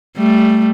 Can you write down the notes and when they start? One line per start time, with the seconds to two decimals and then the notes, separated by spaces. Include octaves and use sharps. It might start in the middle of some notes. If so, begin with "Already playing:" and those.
0.17 G3 A3